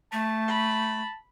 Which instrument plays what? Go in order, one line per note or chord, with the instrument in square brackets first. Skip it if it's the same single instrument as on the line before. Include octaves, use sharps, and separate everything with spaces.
[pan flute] A3 [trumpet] A5
[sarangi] B5